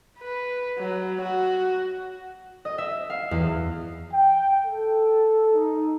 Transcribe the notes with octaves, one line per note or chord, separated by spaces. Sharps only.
B4
F#3
F#4
D#5
E5
F5
E2
G5
A4
D#4